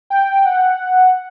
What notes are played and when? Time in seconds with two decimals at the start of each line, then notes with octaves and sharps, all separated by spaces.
0.10 G5
0.45 F#5